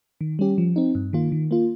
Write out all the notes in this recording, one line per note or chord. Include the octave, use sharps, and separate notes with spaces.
D#3
G3 C#4 G4
F3
C4 D#4
G2
D#3 A#3 F4
D#3
A#3 F4